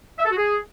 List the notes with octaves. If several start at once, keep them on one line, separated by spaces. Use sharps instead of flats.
E5
A4
F#4
G#4